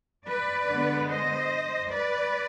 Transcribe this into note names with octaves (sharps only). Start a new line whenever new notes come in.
B4 D5
D3 G#3 B3
C5 D#5
B4 D5